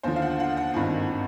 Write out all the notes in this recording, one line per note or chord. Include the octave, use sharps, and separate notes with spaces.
D#2 D3 F3 C5
F5
F#5
F#5
F#5
G#1 G2 D#3